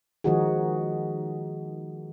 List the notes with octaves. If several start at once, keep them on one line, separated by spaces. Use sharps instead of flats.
D#3 F3 G#3 D#4 F#4 G#4